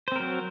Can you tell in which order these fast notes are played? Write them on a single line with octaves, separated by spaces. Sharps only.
C5 C4 A#4 F#3